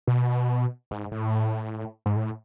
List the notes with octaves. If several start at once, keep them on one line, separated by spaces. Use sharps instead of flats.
B2
G#2
A2
G#2
A2